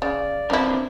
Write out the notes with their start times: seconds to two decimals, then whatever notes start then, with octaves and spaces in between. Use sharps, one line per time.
0.02 C#3 D5
0.50 F3 C4 D4 E4 A#4